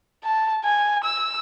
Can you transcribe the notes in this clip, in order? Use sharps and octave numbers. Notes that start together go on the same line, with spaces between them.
A5
G#5
E6